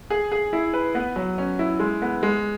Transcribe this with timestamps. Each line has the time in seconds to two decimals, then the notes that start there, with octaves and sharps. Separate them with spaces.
0.10 G#4
0.32 G#4
0.53 E4
0.74 B4
0.95 B3
1.16 F#3
1.38 C#4
1.59 E4
1.80 G#3
2.02 B3
2.23 G#3